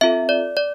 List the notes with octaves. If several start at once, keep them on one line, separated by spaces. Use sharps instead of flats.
C4 F4 A4 E5
D5
D5